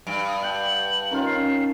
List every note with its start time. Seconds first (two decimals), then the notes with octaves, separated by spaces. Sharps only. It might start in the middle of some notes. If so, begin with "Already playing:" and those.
0.07 G2 D7
0.28 D#6
0.42 F#5 G5 A5 F#7
1.11 D#3 C#4 F4
1.26 C#4 C7